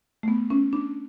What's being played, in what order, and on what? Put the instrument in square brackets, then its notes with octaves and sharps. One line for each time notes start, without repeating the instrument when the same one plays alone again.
[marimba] A3
B3
C#4
D4